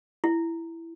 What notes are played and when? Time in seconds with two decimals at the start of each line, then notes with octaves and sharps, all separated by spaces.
0.24 E4